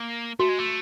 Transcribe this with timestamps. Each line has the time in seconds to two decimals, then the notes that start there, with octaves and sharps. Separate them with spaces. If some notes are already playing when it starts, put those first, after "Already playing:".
Already playing: A#3
0.40 A3 F#4
0.49 G#3
0.59 A3